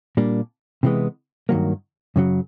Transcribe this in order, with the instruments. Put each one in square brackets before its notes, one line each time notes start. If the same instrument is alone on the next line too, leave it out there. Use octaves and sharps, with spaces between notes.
[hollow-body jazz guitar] A#2 G3 A#3 D4
C3 E3 G#3 B3
G2 D#3 F#3 A#3
F#2 C#3 F#3